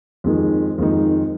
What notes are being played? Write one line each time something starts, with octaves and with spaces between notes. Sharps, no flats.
F2 D#3 G#3 D#4
F2 D#3 G#3 D#4